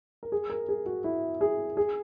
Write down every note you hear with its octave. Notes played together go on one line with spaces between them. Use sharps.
A#4
G#4
A#4
G#4
F#4
E4
G#4
G#4